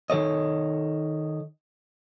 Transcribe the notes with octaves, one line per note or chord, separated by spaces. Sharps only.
D#3 A4 C#5 D#5